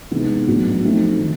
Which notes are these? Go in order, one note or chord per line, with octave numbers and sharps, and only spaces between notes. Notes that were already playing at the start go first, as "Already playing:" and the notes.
C3 E3 G#3 B3 D#4
A2 F#3 B3 D4 F#4
F3 A3 C4 D#4
D#3